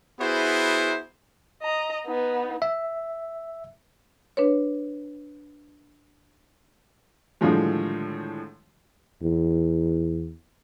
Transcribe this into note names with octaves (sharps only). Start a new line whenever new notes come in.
B3 E4 F#4 G#4 C5
D#5 A#5
B3 D#4
E5
D4 B4 C#5
A2 D3 D#3 F3 G3 G#3
E2